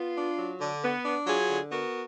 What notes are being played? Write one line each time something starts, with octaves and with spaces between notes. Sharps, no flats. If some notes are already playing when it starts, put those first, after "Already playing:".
Already playing: B3 F4
D4
F#3
D3
B3
D4
F#3 F4 G#4
D3
B3 F#4 A#4